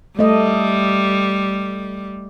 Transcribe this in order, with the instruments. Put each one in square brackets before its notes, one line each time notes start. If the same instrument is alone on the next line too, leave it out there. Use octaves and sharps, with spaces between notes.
[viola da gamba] G3 [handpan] A3 D#5